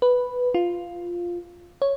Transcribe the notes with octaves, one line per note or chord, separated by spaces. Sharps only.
B4
F4
C#5